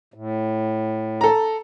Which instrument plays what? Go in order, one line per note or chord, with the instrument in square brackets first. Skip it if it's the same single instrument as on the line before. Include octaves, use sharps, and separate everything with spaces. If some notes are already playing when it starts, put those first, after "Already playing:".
[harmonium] A2
[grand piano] A4 A#5